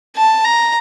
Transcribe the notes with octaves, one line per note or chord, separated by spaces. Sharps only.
A5
A#5